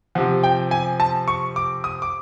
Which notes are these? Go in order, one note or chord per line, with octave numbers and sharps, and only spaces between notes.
C3 F3 F#5
G5
G#5
A5
C#6
D6
D#6
D6